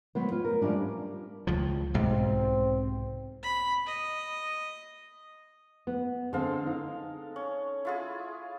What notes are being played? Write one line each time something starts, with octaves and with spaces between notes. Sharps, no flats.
F#3 B3 C5
F4
A#4
F3 G3 A3 C#4 D4
C#2 F3
B1 G#2 C3 C4
B5
D#5
B3
D3 G#3 C4 A4 F5
D#4
C#4
E4 F4 G#4